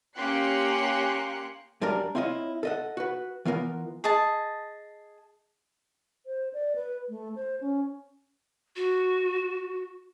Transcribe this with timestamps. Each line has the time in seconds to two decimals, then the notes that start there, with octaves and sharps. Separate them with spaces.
0.17 A#3 C#4 G4 C6 F#6 C#7
1.81 F#2 G3 D4 A#4 A#5
2.15 C4 E4 F4 C#5 D#5
2.63 A4 D#5 F#5
2.97 F#4 B4
3.45 E3 B3 F4 A#4
4.04 G#4 D#5 A5
6.26 C5
6.54 D5
6.76 B4
7.09 A3
7.35 C5
7.61 C#4
8.76 F#4